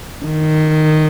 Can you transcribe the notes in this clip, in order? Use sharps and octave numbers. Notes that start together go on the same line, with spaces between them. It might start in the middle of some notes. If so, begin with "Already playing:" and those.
D#3